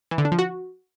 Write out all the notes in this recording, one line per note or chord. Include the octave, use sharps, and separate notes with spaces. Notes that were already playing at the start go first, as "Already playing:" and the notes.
E3
D3
D4
F3
F#4